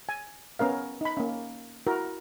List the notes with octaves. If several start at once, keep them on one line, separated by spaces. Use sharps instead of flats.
G#5
B3 C#4 A#4 F5
D#4 B5
A#3 C#4
E4 F#4 A#4